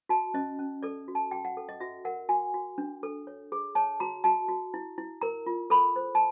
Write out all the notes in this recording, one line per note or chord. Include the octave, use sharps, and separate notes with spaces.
F#4 A5
C#4 D#5
C#4
A4 D5
F#4
A5
F#4 G5
F#5
A4
D#5
F#4 E5
A#4 F#5
F#4 G#5
F#4
D4
A4
C#5
G#4
C#5 A5
F#4 A#5
F#4 A5
F#4
E4
E4
A#4 A#5
F4
A4 B5
C5
A5